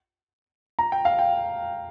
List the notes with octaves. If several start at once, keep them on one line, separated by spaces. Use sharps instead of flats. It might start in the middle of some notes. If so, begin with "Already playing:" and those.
A#5
G5
F5
G5